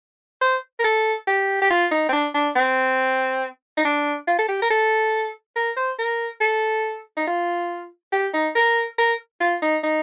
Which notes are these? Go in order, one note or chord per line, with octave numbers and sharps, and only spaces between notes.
C5
A#4
A4
G4
G4
F4
D#4
C4
D4
D4
C4
D#4
D4
F4
A4
G4
A#4
A4
A#4
C5
A#4
A4
D#4
F4
G4
D#4
A#4
A#4
F4
D#4
D#4